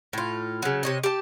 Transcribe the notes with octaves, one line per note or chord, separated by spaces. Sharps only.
A2 F4
C#3 F#3
C3 C#5 D#5
G4 A5